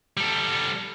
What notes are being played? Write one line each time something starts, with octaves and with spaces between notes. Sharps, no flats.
G3 A4